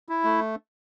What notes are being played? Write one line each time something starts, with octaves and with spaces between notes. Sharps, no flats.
E4
A3